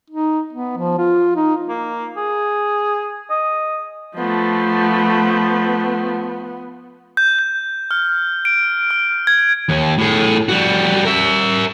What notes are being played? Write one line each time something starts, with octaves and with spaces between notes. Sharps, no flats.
D#4
B3
F3
F4
D#4
A#3
G#4
D#5
F3 A3 B3
G6
G6
F6
D7
F6
G#6
D#2
A2 G#4
G3 F#4
A#4 E5